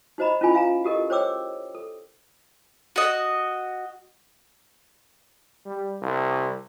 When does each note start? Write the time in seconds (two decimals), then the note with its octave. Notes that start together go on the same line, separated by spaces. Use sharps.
0.18 D#4 F#4 C5 D#5 A#5 B5
0.41 C#4 E4 F4 G#4 G#5 B5
0.54 E5 F5 G#5 A#5
0.84 F#4 G4 A4 A#4 D#5
1.10 C5 C#5 G5 D6 E6
1.75 A4
2.96 F#4 D#5
5.66 G3
6.02 C2